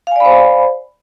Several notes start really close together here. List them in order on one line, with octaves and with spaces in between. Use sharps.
F5 G#5 D5 B5 C5